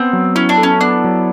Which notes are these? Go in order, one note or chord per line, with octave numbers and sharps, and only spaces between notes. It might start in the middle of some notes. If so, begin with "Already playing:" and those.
Already playing: B3 C4
F#3
C#4 E4
D4
A4
C#4
B3 D4
F#3